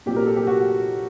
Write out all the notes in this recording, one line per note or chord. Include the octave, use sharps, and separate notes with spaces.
A#2 F#3 C4 G4
A#4
A4
G4
F#4